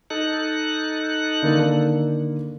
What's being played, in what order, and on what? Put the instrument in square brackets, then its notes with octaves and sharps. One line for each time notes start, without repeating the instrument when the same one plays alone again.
[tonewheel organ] D#4 A4 F#6
[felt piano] D3 D#3 A#3